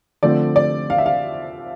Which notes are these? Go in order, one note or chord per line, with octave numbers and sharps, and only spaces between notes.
D3 F3 A3 C4 D5
D5
F5
E5
F5